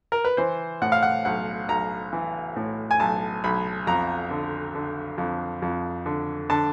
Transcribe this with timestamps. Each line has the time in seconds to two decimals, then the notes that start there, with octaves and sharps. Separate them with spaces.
0.12 A#4
0.25 B4
0.37 E3 C5
0.82 A2 F#5
0.92 F5
1.03 F#5
1.25 B1 F#5
1.69 B1 A#5
2.13 E3
2.56 A2
2.91 G#5
3.00 B1 A5
3.44 B1 B5
3.87 F2 A#5
4.31 D3
4.75 D3
5.18 F2
5.62 F2
6.06 D3
6.50 D3 A5